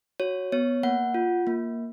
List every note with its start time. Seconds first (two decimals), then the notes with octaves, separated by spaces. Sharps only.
0.20 F#4 C#5
0.52 B3 C#5
0.83 A#3 F#5
1.14 F4
1.47 A#3